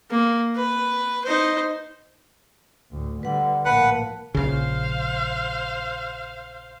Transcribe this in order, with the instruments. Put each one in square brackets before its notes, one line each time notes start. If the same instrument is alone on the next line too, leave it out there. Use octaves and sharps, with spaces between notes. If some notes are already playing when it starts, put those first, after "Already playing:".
[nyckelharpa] A#3
B4
D#4 C5
[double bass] D2 A2
[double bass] D3 G3 [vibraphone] B4 F#5
[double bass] A#1 A2 [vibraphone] A#4 F5 A5 [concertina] B4 F#5
[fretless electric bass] A#1 C#3 [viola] C5 F5